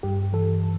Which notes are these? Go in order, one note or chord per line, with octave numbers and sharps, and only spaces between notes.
G2 G4
E3 A4